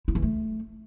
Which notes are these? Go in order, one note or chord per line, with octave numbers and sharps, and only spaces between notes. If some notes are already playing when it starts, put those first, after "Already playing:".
E4
E3
A3